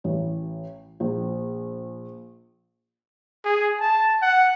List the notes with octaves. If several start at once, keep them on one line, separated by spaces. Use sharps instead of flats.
A1
A#1
G#4
A5
F#5